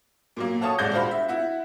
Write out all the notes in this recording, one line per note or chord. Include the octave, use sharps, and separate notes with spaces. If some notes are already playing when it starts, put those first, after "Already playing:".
A#2 F#3 A#3
F#4 A4 C#5 F5 A5 D#6
D#1 C2 G#3 D5 G6 A#6
D4 F4 F#4 C5 F5 B5
E5
E4 F#5